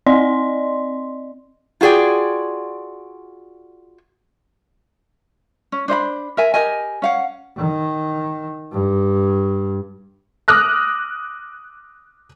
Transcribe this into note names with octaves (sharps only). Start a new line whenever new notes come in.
C4 D5 D#5 C6
F4 F#4 G#4 D5 G5
C#4
D4 C5 D#5 B5
A#4 E5 G#5
G4 A#4 D#5 G#5
C#4 F5 F#5
D#3
G2
D6 D#6 F6 F#6 A#6